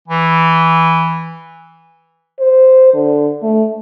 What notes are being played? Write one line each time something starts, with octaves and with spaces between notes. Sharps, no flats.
E3
C5
D3
A3